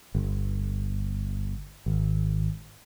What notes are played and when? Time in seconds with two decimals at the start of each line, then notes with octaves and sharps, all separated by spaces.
0.15 G1
1.86 G#1